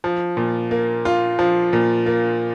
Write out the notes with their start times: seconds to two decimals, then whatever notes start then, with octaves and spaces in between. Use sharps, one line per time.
0.04 F3
0.37 A#2
0.71 A#3
1.05 F4
1.39 F3
1.73 A#2
2.06 A#3